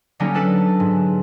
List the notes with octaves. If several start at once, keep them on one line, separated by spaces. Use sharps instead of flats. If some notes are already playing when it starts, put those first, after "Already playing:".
D3 F#3 G3 A#3 C#4 D#4
D4 A4 B4
G#2